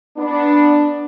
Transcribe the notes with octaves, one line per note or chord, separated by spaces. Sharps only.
B3 D4